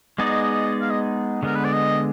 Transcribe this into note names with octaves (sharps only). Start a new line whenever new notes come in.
G#3 B3 D#4 G#4 D5 D#5
F5
D#5
D3 G#3 B3 A#4
B4
D5
D#5